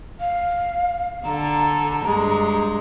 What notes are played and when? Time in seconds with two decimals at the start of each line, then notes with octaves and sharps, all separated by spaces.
0.20 F5
1.25 D3 A4 A#5
2.05 G2 G#3